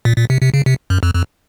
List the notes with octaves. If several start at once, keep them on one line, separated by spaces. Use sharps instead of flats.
A#2
A#2
C3
C3
C#3
C3
F#2
F2
F2